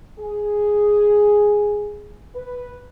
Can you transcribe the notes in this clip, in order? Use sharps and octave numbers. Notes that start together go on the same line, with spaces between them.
G#4
B4